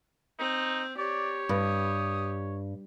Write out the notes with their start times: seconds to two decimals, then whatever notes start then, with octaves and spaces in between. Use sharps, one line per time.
0.39 C4 D#4
0.97 G4 C#5 D5
1.49 G2 D#6